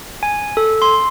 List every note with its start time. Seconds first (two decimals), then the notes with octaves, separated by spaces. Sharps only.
0.23 G#5
0.57 A4
0.82 C6